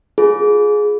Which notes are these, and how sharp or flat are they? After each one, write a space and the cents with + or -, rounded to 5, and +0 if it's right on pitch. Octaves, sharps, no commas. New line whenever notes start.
F4 +30 G#4 +15